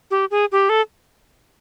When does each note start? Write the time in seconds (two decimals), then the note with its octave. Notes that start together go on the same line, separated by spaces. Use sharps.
0.11 G4
0.31 G#4
0.52 G4
0.69 A4